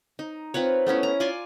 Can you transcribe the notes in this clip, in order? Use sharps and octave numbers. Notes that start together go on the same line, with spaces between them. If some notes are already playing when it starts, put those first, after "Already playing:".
D#4
C4 F4 B4 C#5
A3 B3 C#4 E4
A#5
F4 D5 G#5 C6